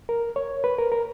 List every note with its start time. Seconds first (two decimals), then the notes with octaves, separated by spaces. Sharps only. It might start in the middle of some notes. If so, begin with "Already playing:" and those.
0.09 A#4
0.36 C#5
0.64 B4
0.78 A#4
0.92 A#4